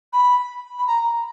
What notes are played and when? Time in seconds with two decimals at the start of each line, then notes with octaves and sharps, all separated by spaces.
0.13 B5
0.79 B5
0.87 A#5